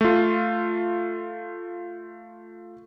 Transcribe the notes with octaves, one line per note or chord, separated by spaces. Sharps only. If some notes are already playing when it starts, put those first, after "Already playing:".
A3 F4